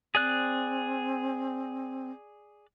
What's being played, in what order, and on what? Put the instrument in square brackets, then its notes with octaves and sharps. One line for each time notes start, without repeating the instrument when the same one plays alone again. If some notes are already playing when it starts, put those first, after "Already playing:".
[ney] C4 [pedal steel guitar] G#4 D5 F#6